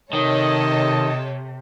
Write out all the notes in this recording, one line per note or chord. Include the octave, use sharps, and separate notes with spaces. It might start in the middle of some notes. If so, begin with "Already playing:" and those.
C3 D#3 A4 C#5 D#5